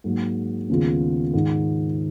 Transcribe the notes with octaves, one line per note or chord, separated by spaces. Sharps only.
G#2 F#3 A#3
D#2 C#3 G#3 B3 F4
G#2 D#3 G#3